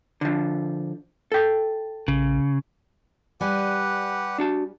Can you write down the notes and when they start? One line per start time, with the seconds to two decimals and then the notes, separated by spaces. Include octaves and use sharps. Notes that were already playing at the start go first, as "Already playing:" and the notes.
0.21 D3 F3
1.32 A4 G5
2.08 A#1 C#3
3.41 G3 G4 B4 D5 F#5 G#5
4.38 D4 F#4 A5